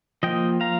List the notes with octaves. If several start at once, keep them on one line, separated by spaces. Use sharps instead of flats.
F3 A#3 D#5 G5
F5 A#5